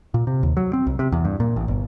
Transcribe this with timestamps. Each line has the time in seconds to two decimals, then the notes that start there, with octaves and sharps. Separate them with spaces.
0.14 A#2
0.27 C3
0.43 D#2
0.57 F#3
0.73 C4
0.87 C2
0.99 C3
1.12 E2
1.25 G2
1.40 A#2
1.56 A1
1.68 G1